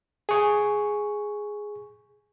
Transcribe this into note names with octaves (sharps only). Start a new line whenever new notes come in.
G#4 C#6